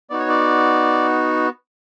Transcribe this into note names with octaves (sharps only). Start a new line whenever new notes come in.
B3 D#4 F#4 D5
C#5
D5